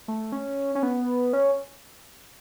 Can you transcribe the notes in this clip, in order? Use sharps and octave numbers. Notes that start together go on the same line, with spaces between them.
A3
C#4
C#4
B3
C#4